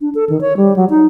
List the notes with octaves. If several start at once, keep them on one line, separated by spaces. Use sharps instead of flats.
D4
A4
D#3
C#5
G3
F#3
D#4